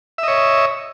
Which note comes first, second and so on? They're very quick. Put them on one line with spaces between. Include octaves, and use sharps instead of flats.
E5 D#5 C#5